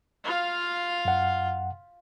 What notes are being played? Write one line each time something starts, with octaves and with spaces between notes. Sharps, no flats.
F4 F5
F#2 F#5